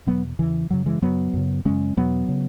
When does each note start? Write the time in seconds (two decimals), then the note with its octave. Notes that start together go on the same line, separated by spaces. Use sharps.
0.07 E2 B2 F#3 B3
0.39 E2 C#3 E3
0.70 F#2 C#3 F#3
0.86 E3 G#3
1.02 F#2 C#3 F#3 B3
1.33 F#2 C#3
1.65 F#2 C#3 G#3 C#4
1.97 E2 B2 F#3 B3
2.29 C#3